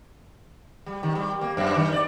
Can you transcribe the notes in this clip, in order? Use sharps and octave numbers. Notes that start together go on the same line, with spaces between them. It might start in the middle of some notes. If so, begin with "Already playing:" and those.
G3
D#3
G3
A#3
F#2
D#3
D5